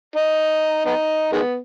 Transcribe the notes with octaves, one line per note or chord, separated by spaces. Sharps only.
D#4
B3 D#4
D#3 G#3 B3